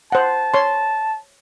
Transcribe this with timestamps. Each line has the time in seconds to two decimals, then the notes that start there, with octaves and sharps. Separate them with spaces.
0.12 C5 F#5 A5
0.54 C#5 C6